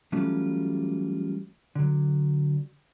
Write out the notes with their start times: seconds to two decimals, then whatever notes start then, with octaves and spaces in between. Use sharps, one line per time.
0.12 E3 F#3 G3 A3 C#4 F4
1.75 D3 F#3